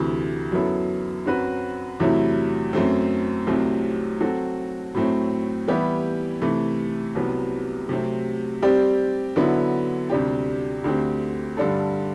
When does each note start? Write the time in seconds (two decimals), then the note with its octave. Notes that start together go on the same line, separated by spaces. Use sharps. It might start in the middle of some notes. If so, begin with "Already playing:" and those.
Already playing: D2 C3 E3
0.52 F#2 F#3 B3 E4 A4
1.26 F#2 F#3 C4 F#4 B4
2.00 E2 C3 F#3 A3 E4
2.73 F#2 F#3 A3 C4
3.47 C2 C3 F#3 A3 C4
4.21 F#3 C4 F#4 A4
4.94 A2 F#3 A3 C4
5.68 E3 G3 B3 E4 G4
6.42 C3 E3 A3
7.15 C2 C3 F#3 B3
7.89 C3 F#3 A3 C4
8.62 G3 C4 G4 D5
9.36 D3 F#3 B3 E4
10.10 D2 C3 G3 D4 G4
10.84 D2 D3 A3 C4 G4
11.57 G2 D3 G3 D4 A4